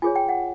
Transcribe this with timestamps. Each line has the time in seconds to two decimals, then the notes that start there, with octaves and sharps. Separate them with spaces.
0.02 F4 G#4 C#5 G#5
0.16 G5
0.29 F#5